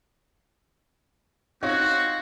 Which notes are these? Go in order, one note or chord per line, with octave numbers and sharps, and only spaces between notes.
C4 D#4 F4 F#4 C#5